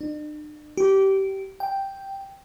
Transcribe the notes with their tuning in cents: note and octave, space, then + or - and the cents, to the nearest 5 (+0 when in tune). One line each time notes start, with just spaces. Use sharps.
D4 +45
G4 -20
G5 +0